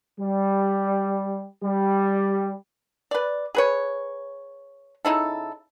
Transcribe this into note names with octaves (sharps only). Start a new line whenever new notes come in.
G3
G3
B4 D5
G#4 B4 C#5
C#3 D#4 E4 A4